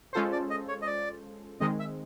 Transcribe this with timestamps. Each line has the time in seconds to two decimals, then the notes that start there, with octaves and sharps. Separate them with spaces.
0.13 G#3 C#4 F4 A4 C5
0.32 D5
0.50 D#5
0.68 C#5
0.82 D#5
0.87 D5
1.60 D#3 G#3 C4 D#5
1.79 E5